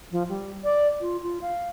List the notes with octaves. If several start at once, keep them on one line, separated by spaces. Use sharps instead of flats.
F3
G3
D5
F4
F4
F5